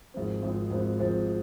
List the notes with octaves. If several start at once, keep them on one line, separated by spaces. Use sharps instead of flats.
G#1 G#2 F3 C4
G#1 G#2 F3 C4
G#1 G#2 F3 C4
G#1 G#2 F3 C4